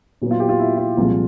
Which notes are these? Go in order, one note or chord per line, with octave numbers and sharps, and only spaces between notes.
A#2 F#3 B3
F4
G4
F4
E4
F4
C2 A#2 F3 G#3